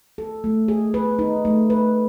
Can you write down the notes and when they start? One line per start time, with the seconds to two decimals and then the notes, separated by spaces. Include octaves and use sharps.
0.18 A4
0.44 A3
0.68 G#4
0.94 B4
1.19 D#4
1.45 A3
1.70 B4